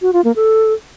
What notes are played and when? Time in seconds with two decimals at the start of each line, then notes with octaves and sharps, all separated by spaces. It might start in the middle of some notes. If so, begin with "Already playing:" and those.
0.02 F#4
0.13 F4
0.24 A#3
0.36 A4